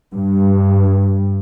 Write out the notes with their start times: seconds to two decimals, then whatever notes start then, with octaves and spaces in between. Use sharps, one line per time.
0.14 G2